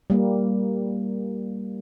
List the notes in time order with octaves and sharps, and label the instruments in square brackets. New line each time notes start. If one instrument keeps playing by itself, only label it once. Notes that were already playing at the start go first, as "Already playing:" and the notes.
[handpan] G3 A#3